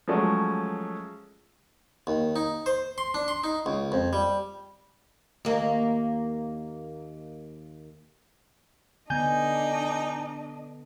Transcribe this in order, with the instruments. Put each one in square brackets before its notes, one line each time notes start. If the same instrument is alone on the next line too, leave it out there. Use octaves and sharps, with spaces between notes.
[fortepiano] F3 F#3 G#3 A3 C#4
[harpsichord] D#2
D#4
C5
C6
D4
C6
D#4
C#2
F2
G3
[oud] D#2 A#3
[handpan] D3 B3 [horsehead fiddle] D4 D#5 [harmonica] D#4 A#5 [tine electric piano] G#5 G6